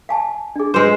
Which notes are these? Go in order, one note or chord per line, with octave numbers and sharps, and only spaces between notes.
F5 G#5 A5
D4 G#4
G#3 B4 C5